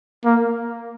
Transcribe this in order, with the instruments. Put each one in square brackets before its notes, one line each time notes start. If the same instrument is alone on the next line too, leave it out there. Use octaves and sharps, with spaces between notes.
[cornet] A#3